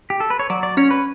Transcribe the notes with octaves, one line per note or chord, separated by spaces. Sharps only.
G4
A4
B4
C#5
F#3 D5
D5
C#4 C#5
B4